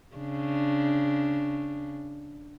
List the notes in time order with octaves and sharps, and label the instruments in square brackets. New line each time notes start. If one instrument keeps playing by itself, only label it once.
[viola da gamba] C#3 D4